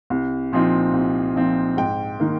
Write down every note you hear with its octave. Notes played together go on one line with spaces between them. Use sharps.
C2
A#2 F3 C4 D#4
C2
A#2 F3 C4 D#4
G#2 G5
D#3 A#3